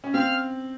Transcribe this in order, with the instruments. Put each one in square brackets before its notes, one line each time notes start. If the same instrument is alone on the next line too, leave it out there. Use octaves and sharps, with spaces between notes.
[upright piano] C#4
[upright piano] C4 [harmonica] F5